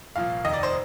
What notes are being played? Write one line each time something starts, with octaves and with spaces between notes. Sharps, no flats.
C2 A#2 F3 F5
F1 D#2 D#3 D#5
D5
C5